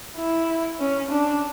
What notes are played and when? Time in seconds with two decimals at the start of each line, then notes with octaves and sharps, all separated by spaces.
0.16 E4
0.80 C#4
1.11 D4